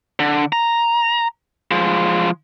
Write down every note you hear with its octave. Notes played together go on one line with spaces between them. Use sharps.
D3
A#5
F3 G#3